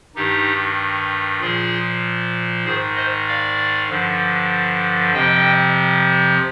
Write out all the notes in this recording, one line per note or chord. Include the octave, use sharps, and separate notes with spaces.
G2 D#3 D#4 G4
A#2 F3 F4 G#4
G#2 D#3 G#4 C5
C5 D#5
D5 F5
G2 D3 F3
F2 C3 F3 D#5 G5